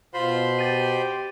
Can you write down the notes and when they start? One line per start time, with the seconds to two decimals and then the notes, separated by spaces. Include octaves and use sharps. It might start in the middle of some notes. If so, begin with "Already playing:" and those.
0.14 B2 F4 C5 B5 C6
0.59 G4 A6 D#7